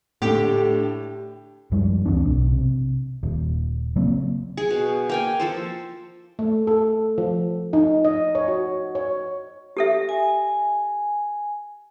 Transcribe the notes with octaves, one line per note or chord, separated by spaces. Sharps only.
A2 D3 G4
F#2 F3 G3 G#3
C#2 E3 C4 D4
B1
C3
D#1
C#3 F#3 A#3 C4
G#4
B2
A#3 G5 G#5
F3 A4 C5
A3
A4
F3
D#4
D#5
C#5
F#4
C#5
G4 A4 E5
G#5